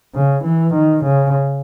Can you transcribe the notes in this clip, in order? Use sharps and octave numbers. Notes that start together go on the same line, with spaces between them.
C#3
E3
D#3
C#3